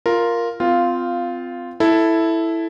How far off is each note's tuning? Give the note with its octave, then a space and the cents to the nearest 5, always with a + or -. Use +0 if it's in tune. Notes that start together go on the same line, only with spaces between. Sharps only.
F4 +0 A#4 +0
C4 -30 F4 -5 F5 +0
E4 +0 A4 +0